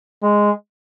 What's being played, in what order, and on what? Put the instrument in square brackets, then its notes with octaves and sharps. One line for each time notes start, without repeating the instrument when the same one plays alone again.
[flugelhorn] G#3